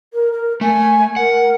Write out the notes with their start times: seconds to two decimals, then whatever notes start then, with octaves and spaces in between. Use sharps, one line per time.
0.13 A#4
0.32 A#4
0.61 A3 G#5
1.16 A#4 F#5